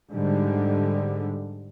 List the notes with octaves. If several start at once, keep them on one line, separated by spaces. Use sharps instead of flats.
G#2 D3 G3